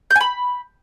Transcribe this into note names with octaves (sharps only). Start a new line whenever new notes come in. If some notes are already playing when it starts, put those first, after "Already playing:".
G6
G#5
B5